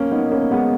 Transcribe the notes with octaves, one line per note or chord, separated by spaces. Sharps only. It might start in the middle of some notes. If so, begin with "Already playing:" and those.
Already playing: A#3 C#4
B3 D#4
A#3 C#4
G#3 B3